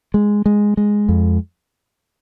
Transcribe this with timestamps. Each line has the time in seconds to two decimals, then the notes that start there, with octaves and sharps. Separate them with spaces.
0.14 G#3
0.46 G#3
0.77 G#3
1.09 F2